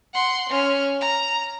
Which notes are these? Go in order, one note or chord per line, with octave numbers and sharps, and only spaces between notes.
F#5 C6
C#4 F6
A#5